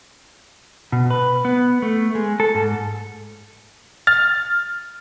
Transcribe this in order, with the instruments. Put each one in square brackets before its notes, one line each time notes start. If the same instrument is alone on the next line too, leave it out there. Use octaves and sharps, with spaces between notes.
[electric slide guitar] B2
B4
B3
A3
G#3
A4
G#2
[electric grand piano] F6 A6